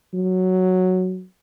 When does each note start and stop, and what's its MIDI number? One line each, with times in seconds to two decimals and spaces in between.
0.14 1.23 54